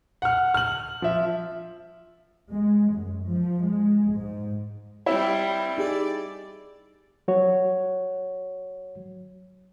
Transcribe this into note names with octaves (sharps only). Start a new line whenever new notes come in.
F#5 F6
F6 F#7
F3 E5
G#3
F#2
F3
G#3
G#2
G3 C4 E4
D#4 G4 G#4 D5
F#3 F#4 C#5